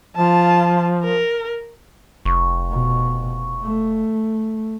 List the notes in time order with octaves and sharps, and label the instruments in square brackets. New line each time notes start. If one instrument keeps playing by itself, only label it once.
[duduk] F3 [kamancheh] F4 A5
[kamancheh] A#4
[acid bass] F1 [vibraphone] C#6
[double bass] B2
A3